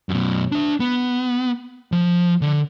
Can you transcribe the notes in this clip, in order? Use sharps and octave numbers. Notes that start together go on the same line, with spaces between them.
F#2 B2
D4 E5
B3
F3
D3